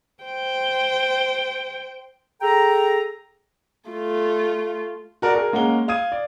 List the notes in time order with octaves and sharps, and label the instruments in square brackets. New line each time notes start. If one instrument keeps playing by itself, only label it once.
[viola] C5 G5
[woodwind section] G#4 A4 G5 A#5
[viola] A3 F4
[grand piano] F#4 A#4 D5 F#5
G#4 A#4
G#3 A#3 C#4 F#5 A#5 G7
F5 D#6 G#6 D#7
D5